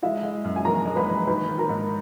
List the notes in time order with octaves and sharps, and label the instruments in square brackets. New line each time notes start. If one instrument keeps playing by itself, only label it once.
[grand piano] G#3 [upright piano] E4 E5
[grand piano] G#3
F#2
[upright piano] G#5
[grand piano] E3 [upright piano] A#4 A#5
[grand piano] G#3
[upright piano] B4 B5
[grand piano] E3
[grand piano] D#3 [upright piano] B4 B5
[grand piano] D#3
[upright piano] A#4 A#5
[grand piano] G#2